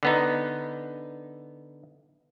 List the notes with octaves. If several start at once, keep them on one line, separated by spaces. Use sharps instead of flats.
D3 B3 D#4